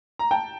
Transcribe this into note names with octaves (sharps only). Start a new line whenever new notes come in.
A#5
G5 A5